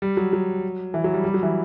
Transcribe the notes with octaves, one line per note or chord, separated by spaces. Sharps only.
G3
F#3
F#3
E3
F#3
G3
G3
F#3
E3